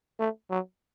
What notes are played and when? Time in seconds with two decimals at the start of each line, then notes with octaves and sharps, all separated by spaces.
0.19 A3
0.50 F#3